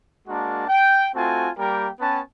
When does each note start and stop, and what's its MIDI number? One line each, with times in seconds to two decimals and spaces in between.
0.28 0.65 56
0.28 0.65 58
0.28 0.65 62
0.28 0.65 66
0.28 0.65 70
0.28 0.65 81
0.68 1.08 79
1.14 1.50 57
1.14 1.50 60
1.14 1.50 65
1.14 1.50 66
1.14 1.50 80
1.14 1.50 81
1.58 1.89 55
1.58 1.89 58
1.58 1.89 67
1.58 1.89 70
1.58 1.89 79
2.00 2.20 59
2.00 2.20 61
2.00 2.20 71
2.00 2.20 79
2.00 2.20 81